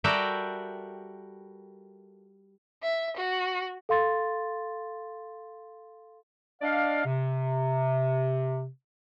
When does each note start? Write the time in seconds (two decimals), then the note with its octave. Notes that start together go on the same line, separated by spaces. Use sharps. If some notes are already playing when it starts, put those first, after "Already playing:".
0.04 G3 F#4 A4 A#4 E5 G5
2.82 E5
3.16 F#4
3.89 A4 F5 C6 A6
6.62 D4 D5 D#5 F5
7.05 C3